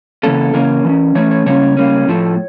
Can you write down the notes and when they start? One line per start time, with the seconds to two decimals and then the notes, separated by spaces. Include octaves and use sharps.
0.23 C#3 E3 A#3 C#4 A4
0.54 C#3 E3 A#3 C#4 A#4
0.85 E3 A3 C#4
1.15 E3 A3 C#4 C#5
1.31 C#5
1.46 C#3 G3 A#3 C#4 C#5
1.77 C#3 G3 A#3 C#4
2.08 A2 F3 A3